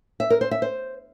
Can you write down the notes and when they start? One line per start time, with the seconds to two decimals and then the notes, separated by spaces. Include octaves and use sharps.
0.20 E5
0.30 A#4
0.41 C5
0.51 E5
0.62 C5